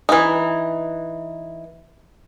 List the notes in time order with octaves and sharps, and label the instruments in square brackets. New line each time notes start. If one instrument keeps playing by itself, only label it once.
[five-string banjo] E3 D#4